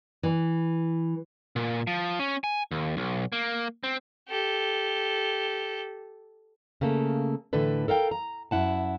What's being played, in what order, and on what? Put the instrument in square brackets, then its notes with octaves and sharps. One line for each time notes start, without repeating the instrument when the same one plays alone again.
[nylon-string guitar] E3
[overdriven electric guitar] A#2
F3
C#4
G#5
D#2
B1
A#3
C4
[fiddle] G4 A4
[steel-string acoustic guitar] C#3 A3 A#3 A4
A2 D3 E3 A4 B4
A4 A#4 F5 G5
A#5
F#2 E4 F#5 A5